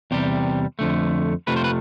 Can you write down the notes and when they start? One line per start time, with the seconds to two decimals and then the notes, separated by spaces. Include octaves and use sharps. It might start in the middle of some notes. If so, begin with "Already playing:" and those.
0.11 E2 C3 G3 G4
0.79 F2 D3 F3 A3
1.47 F2 C3 F3 A3 B4
1.56 C5
1.64 B4